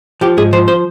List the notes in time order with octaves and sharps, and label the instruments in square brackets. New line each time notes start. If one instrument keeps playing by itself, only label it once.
[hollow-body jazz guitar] F3 G4
G#2 G#4
F3 C5
C5